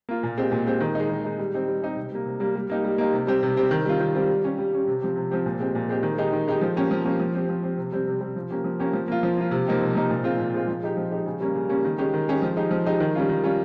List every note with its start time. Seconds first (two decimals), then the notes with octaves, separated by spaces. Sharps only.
0.09 A#3 F4
0.23 A#2
0.38 G#3 C4 G4
0.52 A#2
0.66 G#3 C4 G4
0.81 D#3
0.95 G#3 D#4
1.10 D#3
1.25 G#3 D#4
1.39 G3
1.54 C4 D#4 G4
1.68 G3
1.82 C4 D#4 G4
1.96 C3
2.11 G3 A#3
2.26 C3
2.40 G3 A#3
2.55 G3
2.70 A#3 D#4 G4
2.84 G3
2.98 A#3 D#4 G4
3.13 C3
3.27 G3 C4 G4
3.43 C3
3.56 G3 C4 G4
3.71 D#3
3.85 G3 C4 F4
4.00 D#3
4.15 G3 C4 F4
4.29 G3
4.44 C#4 G4
4.58 G3
4.72 C#4 G4
4.87 C3
5.02 F3 C4 G4
5.16 C3
5.31 F3 C4 G4
5.46 A#2
5.60 G#3 C4 G4
5.75 A#2
5.89 G#3 C4 G4
6.03 D#3
6.18 G#3 D#4 G4
6.33 D#3
6.48 G#3 D#4 G4
6.61 F3
6.76 A#3 C#4 G4
6.91 F3
7.05 A#3 C#4 G4
7.20 F3
7.35 C4 G4
7.49 F3
7.63 C4 G4
7.78 C3
7.92 G3 C4
8.07 C3
8.21 G3 C4
8.36 F3
8.51 A#3 C#4 G4
8.64 F3
8.79 A#3 C#4 G4
8.93 F3
9.08 A#3 F4
9.23 F3
9.37 A#3 F4
9.51 C3
9.67 F3 A#3 D#4 G4
9.80 C3
9.95 F3 A#3 D#4 G4
10.10 A#2
10.24 G#3 C4 F4
10.39 A#2
10.54 G#3 C4 F4
10.68 F3
10.83 G#3 D#4 G4
10.97 F3
11.11 G#3 D#4 G4
11.26 C#3
11.40 G3 A#3 C#4
11.55 C#3
11.69 G3 A#3 C#4
11.85 D#3
11.98 G#3 C#4 G4
12.14 D#3
12.28 G#3 C#4 G4
12.42 F3
12.57 G#3 D#4 G4
12.71 F3
12.86 G#3 D#4 G4
13.00 D#3
13.15 G3 C#4 F4
13.29 D#3
13.44 G3 C#4 F4